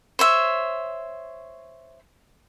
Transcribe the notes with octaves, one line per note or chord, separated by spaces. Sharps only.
C5 C#5 E5